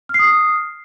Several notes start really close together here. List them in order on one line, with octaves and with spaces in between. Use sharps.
F6 C7 D#6